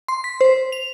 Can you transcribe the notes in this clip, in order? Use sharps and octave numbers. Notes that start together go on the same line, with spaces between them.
C6
B6
C5
F7